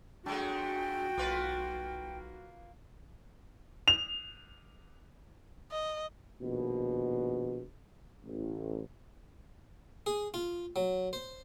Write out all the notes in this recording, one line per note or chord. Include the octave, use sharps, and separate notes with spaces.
F#3 G#3 A3 D4 F#4 G5
B1 A#3 F4 B4
F7
D#5
A#1 D#2 B2
A1
G#4
F4
F#3
C5